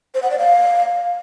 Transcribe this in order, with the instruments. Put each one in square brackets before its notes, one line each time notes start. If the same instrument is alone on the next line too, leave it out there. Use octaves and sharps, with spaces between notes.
[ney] C5
F#5
D5
F5